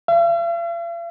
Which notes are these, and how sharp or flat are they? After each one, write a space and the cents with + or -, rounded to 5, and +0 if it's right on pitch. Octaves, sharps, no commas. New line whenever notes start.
F5 -45